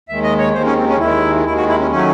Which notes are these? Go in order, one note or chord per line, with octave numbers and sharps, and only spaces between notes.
D#2 D#3 G#3 E5
D#5
C#5
D#2 D#3 G#3 C5
C#4
C4
C#4
D#2 D#3 G#3 E4
D#2 D#3 G#3 E4
F#4
E4
C#4
D#3 F#3 A3 C#4